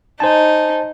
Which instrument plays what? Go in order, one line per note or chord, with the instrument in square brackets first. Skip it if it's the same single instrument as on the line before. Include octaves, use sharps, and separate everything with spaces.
[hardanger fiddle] D#4 [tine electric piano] C5 G#5 A5